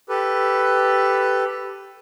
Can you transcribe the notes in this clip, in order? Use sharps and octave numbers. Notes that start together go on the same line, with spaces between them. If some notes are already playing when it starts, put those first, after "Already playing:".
G4 A4 B4